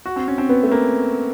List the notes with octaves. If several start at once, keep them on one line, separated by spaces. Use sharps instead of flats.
F#4
C4
C#4
C4
B3
A3
A#3